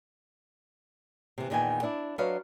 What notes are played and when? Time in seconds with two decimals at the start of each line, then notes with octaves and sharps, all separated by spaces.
1.38 C3 E3
1.50 E2 A#2 D#3 B3 G5 G#5
1.83 D4 E4 D5
2.18 F#3 D4 B4 C#5 D#5 F5